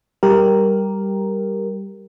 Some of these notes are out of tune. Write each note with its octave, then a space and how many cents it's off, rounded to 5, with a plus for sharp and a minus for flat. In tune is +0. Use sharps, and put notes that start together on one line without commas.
G3 +0 G4 +0 A#4 +0